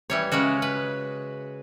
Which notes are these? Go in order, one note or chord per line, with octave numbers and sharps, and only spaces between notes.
E3 G3 C#5
C#3 G#3 C#4 F#4
B4